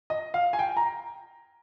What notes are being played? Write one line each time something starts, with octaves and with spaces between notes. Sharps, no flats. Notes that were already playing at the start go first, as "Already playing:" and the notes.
D#5
F5
G#5
G5
A#5